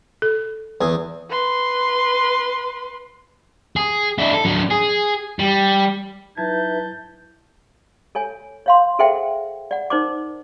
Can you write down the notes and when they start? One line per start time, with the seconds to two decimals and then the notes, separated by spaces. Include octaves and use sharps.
0.22 A4
0.81 E2 G#4
1.30 B4 C6
3.76 G#4
4.18 D4 E4
4.33 A4
4.45 F#3 D4
4.70 G#4
5.39 G3
6.38 F#3 D#4 E4 B4 E5 A5 G6 G#6
8.15 A4 C#5 G#5
8.66 C#5 F5 C6
8.99 G#4 A4 C5 E5 F#5 G5
9.71 D5 F#5
9.90 D#4 A#4 C5 D5 D6